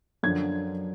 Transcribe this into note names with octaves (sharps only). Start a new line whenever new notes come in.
F#2 D3 F3 G#6